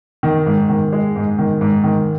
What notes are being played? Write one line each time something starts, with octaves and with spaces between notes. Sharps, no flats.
D#3
G#2
D#3
G#3
G#2
D#3
G#2
D#3